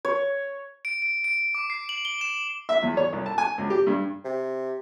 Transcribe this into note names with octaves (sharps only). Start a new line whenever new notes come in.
C#5
D7
D7
D7
D6
C7
F#7
G7
E7
E5
E2
C#5
C2
A5
G#5
C#2
G4
G2
C3